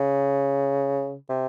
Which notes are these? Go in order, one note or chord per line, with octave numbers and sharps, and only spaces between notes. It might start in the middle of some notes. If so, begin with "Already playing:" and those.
Already playing: C#3
C3